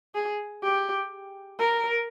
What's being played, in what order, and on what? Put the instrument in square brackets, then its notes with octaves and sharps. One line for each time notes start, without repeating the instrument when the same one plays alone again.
[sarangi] G#4
G4
A#4